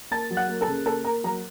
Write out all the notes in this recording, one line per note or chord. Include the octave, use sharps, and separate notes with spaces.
A#3 A5 A6
F#3
F#5 F#6
A#3
A4 A5
C#3
A#3 A4 A5
A#3 A#4 A#5
F#3 A#4 A#5